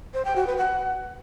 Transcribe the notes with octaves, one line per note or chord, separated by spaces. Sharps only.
C5
G5
F#4
B4
F#5